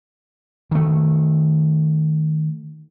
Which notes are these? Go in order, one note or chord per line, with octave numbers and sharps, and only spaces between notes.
D#3 A3